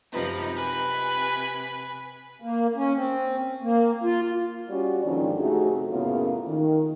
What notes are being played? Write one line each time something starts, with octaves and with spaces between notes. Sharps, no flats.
F#2 C3 F3 D#4 B4
C3 B4 G#5 B5
A#3
C#4
C4
A#3
F4
G3 C#4 F4 F#4 D5
D#2 G#2 D3 D#3 F3 C#4
F2 C3 A3 D#4 F#4 G#4
F#2 A2 C#3 A#3 B3 F4
D#3